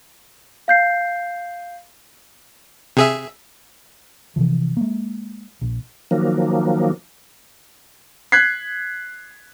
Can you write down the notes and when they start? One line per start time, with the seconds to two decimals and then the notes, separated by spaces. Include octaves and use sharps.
0.68 F5 G6 C7
2.97 C3 G#4 E5
4.36 C3 E3 F3
4.77 G#3 A#3
5.61 A#1
6.11 D#3 F3 F#3 A#3
8.32 F#6 G#6 B6 C7